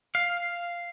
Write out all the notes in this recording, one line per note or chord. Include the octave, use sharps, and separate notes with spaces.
F5